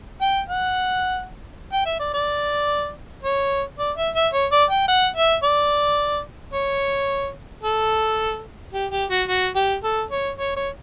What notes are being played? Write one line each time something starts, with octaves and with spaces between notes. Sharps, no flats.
G5
F#5
G5
E5
D5
D5
C#5
D5
E5
E5
C#5
D5
G5
F#5
E5
D5
C#5
A4
G4
G4
F#4
F#4
G4
A4
C#5
C#5
C#5